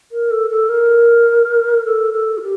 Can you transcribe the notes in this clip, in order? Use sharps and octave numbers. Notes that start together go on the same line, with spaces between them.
A#4
A4
A4
A#4
A4
A4
F4
G4